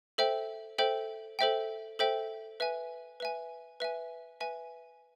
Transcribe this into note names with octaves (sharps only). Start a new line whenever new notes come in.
A4 C5 E5 G5
A4 C5 E5 G5
A4 C5 E5 G5
A4 C5 E5 G5
B4 E5 G#5
B4 E5 G#5
B4 E5 G#5
B4 E5 G#5